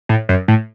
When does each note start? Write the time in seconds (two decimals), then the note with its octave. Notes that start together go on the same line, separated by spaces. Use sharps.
0.09 A2
0.29 F#2
0.48 A2